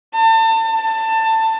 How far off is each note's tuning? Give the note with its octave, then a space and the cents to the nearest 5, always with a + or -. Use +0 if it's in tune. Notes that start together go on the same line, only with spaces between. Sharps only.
A5 +35
A5 +20